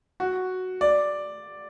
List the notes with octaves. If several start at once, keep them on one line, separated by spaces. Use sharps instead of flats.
F#4
D5